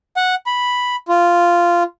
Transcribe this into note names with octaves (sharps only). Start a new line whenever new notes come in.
F#5
B5
F4